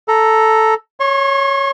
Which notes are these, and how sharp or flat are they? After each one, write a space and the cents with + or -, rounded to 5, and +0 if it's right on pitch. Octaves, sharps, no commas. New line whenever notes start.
A4 +0 A#5 +0
C#5 +0 C#6 -45